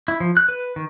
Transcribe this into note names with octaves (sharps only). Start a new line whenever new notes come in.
E4
F3
F#6
B4
D#3